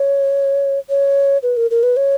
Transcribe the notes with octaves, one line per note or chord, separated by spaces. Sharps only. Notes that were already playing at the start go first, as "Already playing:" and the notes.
Already playing: C#5
C#5
B4
A#4
A#4
B4
C#5